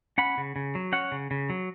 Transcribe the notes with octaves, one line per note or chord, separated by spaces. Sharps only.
C#4 F#5 B5
C#3
C#3
F#3
C#4 C#5 F#5
C#3
C#3
F#3